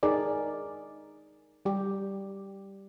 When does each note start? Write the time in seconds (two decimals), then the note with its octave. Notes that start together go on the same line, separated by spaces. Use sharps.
0.03 D#4 G#4 A#4 D5
1.65 G3 G4